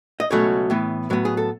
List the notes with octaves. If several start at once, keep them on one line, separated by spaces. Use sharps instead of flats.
D#5
C#2 B2 F#3 A3 C#4 C#5
A2 E3 B3
A2 F#3 B3
G#4
A4